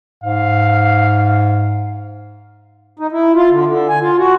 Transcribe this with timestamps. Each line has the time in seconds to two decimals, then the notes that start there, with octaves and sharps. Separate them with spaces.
0.24 G#2 F5
2.99 D#4
3.12 E4
3.35 F4
3.50 D3
3.67 D3
3.89 G#5
4.01 F4
4.18 F#4